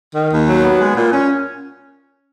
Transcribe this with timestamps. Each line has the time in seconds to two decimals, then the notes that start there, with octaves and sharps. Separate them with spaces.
0.15 D#3
0.32 D#2
0.48 F#3
0.63 B3
0.80 G#3
0.96 A#2
1.12 C#4